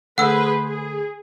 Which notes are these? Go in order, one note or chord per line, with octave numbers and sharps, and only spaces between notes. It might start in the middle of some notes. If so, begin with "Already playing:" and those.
D3 A3 G#4 A4 B4 C5 F#5 E6
G#4